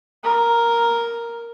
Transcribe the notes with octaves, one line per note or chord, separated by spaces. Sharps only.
A#4